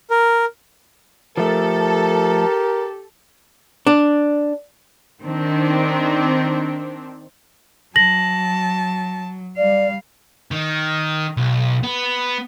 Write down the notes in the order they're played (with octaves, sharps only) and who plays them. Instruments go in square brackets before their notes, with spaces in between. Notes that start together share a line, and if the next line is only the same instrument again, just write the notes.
[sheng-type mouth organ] A#4
[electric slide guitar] F3 A3 [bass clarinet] G4 [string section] A4 [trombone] A#4
[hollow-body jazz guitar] D4
[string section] D#3 C4 D4
[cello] F#3 [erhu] A5 [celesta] A#6 F#7
[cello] G3 F5 [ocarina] D5
[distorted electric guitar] D#3
B1
B3